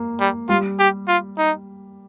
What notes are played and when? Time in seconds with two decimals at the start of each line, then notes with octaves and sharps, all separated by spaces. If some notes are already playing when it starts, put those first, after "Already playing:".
Already playing: A#3
0.20 G3
0.49 G3 F4
0.79 G4
1.08 F4
1.38 D#4